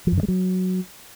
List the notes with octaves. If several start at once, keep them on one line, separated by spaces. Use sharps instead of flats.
F3
F#2
D3
G#3
F#3